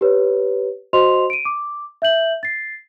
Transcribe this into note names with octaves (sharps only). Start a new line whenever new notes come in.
G4 B4 C#5
F#4 C5 D#5 C6 F7
D7 D#7
D6
E5 G6 F#7
A6 C7